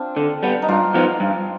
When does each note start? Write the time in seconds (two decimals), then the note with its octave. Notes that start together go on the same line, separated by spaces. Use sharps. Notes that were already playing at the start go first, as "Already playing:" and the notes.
Already playing: C4 D4 F4
0.16 D3
0.43 G3 B3
0.62 D#4
0.68 G2 D4 F4
0.94 F3 B3 D#4
1.20 G2